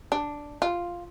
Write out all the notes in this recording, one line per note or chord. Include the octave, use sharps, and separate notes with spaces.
D4
F4